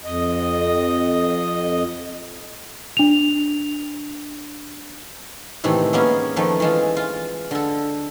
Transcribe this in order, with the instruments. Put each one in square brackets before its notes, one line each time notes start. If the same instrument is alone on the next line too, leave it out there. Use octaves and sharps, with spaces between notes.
[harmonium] F2 D#5
[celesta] D4 F7
[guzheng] A2 C3 D#3 E3 A3
G#3 A#3 B3 C#4
D#3 F3 A3 B4
E3 G#3 F4
F4
D3 A4